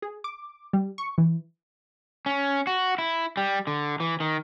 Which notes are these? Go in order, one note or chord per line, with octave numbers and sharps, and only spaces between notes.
G#4
D6
G3
C#6
E3
C#4
F#4
E4
G3
D3
E3
D#3